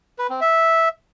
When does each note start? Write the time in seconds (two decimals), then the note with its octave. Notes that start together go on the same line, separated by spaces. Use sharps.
0.19 B4
0.30 C4
0.41 E5